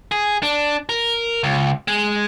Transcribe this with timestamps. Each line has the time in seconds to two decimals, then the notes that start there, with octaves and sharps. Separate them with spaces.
0.12 G#4
0.43 D4
0.89 A#4
1.43 C#2
1.88 G#3